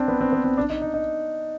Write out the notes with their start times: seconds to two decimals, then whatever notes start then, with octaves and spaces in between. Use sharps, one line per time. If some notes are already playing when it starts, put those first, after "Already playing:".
Already playing: C4 D4
0.08 B3
0.21 C4
0.33 B3
0.44 C4
0.57 D4
0.70 D#4
0.82 D#4
0.94 D#4